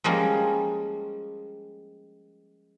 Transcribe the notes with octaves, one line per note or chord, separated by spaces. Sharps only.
F3 G3 G#3 A#3 C#4